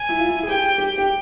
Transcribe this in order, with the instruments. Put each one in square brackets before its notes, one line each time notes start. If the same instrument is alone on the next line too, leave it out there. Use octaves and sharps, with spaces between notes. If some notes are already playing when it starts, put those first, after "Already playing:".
Already playing: [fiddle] G#5
[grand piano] E4
F4
E4
G#4
[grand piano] G4 [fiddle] G5
[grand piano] G4
G4